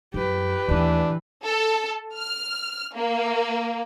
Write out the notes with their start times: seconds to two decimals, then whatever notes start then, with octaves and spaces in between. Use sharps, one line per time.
0.14 F#2 G4 B4
0.68 D#2 E3 A3 D4
1.45 A4
2.16 F6
2.95 A#3